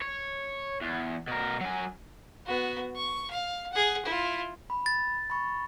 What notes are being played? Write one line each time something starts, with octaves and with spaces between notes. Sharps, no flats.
C#5
E2
B2 A#4
F#3 G#5
B3 F#4
C#6
F5
G#4 F#5
E4 F4
B5
A6
B5 C#6